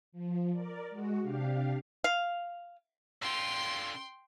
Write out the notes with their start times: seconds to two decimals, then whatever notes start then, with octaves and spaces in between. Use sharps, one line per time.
0.12 F3
0.52 A#4 D5
0.90 G#3 F#4
1.22 C3 D4 G4 F5
2.04 F5
3.22 D3 F4 G5 C6